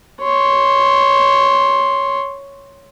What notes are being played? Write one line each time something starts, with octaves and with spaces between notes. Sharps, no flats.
C#5 C6